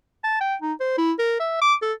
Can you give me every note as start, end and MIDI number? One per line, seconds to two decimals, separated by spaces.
0.24 0.40 81
0.40 0.55 79
0.62 0.73 63
0.80 0.95 72
0.98 1.12 64
1.19 1.36 70
1.40 1.57 76
1.61 1.74 86
1.82 1.93 69